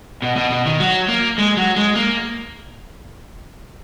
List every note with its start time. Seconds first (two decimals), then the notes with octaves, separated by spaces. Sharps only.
0.22 B2
0.36 B2
0.51 B2
0.66 D#3
0.80 F#3
1.08 A#3
1.38 G#3
1.57 F#3
1.76 G#3
1.95 A#3